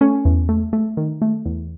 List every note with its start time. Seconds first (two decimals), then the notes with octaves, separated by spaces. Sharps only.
0.01 A3 C#4
0.25 E2
0.49 A3
0.73 A3
0.97 D#3
1.22 A3
1.45 E2